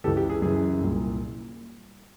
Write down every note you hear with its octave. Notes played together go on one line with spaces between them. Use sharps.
C#2 C#3 E3 G4 A4
G4
G#4
F#2 C#3 E3 G#4
C2 A#2